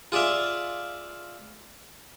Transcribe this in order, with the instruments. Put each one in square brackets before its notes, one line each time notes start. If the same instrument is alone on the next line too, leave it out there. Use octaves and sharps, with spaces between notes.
[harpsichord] F4 G#4 D5 E5 F5